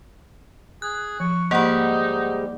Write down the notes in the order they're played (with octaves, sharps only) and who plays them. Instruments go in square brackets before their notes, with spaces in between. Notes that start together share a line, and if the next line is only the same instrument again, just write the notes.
[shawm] G#4 [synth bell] F#6
[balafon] F3 [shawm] C#6
[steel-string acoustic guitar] G#2 G3 [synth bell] A#3 F#5 [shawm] D#4